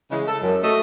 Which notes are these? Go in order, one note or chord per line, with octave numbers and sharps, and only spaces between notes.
C#3 E3 G#3
A4
F#2
A3 F#4 A4 D#5